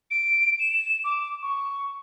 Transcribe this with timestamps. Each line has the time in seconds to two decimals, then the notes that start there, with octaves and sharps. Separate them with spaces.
0.11 D7
0.59 E7
1.04 D6
1.42 C#6